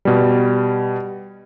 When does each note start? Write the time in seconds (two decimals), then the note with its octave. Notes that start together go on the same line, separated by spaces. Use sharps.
0.05 B2 G3